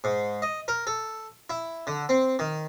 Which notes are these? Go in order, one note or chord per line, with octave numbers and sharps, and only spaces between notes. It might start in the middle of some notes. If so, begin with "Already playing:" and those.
G#2
D#5
A#4
A4
E4
D3
C4
D#3